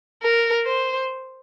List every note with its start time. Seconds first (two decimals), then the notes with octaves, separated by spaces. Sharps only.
0.23 A#4
0.66 C5